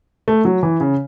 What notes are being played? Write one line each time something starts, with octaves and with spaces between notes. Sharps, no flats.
A3
F#3
E3
C#3